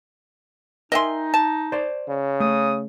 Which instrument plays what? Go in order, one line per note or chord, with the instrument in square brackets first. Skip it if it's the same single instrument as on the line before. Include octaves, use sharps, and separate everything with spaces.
[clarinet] D#4 [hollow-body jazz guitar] A#4 G5 G#5 [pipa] D#5 E5 C6
[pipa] A5
[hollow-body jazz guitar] C5 D5
[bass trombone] C#3
[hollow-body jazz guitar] A3 [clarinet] D#6